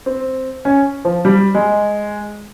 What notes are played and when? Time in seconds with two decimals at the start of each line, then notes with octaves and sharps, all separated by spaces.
0.06 C4
0.65 C#4
1.05 F3
1.25 G3
1.55 G#3